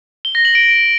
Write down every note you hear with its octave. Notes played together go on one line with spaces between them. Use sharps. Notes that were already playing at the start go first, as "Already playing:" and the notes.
G7
A#6
F#7
D7